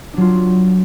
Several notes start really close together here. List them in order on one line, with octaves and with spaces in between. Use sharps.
D4 F#3 F4